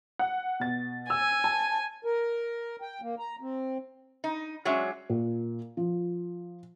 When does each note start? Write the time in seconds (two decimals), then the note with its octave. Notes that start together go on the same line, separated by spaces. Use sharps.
0.19 F#5
0.60 B2 A6
1.10 G#5 E6
1.44 A5
2.05 A#4
2.82 G5
3.01 A#3
3.19 A#5
3.41 C4
4.24 D#4
4.65 F#3 G#3 C#4 D4 E5
5.10 A#2
5.77 F3